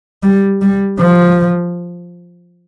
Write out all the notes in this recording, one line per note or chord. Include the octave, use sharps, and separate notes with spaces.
G3
G3
F3